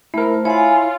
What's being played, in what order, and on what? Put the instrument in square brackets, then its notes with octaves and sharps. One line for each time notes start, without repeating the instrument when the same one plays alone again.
[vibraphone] A3 C5 [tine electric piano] E4 A#4
[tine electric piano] E4 [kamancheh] F4 [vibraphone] C#5 F#5 [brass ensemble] G#5